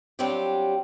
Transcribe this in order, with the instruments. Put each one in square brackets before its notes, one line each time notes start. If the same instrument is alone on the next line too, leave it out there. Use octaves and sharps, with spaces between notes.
[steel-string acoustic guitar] F#3 G3 C4 D4 F4 G4